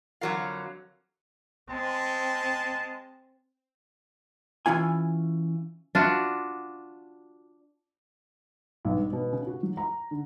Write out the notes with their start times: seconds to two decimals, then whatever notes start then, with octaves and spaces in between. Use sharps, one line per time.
0.21 F2 D3 F#3 A#4 F5
1.68 G#3 C4 A5
4.66 E3 C#4 F4 G#5
5.95 D4 F4 F#4
8.85 B1
8.97 G2
9.13 B2
9.33 C#3
9.47 F#4
9.63 F#3
9.77 A#5
10.11 D3